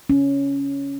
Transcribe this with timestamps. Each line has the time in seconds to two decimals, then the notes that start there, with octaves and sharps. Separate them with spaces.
0.10 C#4